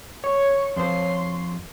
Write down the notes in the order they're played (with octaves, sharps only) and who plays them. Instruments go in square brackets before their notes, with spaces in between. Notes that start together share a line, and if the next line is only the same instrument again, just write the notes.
[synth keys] C#5 [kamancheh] C#6
[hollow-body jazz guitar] F2 C5 [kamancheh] C6